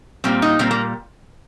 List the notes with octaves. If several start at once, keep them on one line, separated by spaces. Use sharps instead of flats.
A#2 G3 A#3 C4
D#4
A#2 G3 A#3 C4
A#3